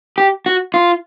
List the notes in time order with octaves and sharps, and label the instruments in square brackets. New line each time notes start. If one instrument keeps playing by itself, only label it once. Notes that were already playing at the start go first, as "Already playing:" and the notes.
[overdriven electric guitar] G4
F#4
F4